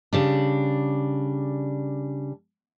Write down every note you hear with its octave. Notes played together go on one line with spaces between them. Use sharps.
C#3 G3 D4